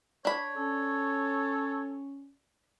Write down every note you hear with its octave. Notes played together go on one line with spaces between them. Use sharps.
D4 C#5 B5
C#4 A4